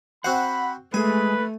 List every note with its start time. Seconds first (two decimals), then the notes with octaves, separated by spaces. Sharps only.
0.24 C4 F#4 C5 F#5 B5
0.94 G#3 A3 G#4 B4 G#5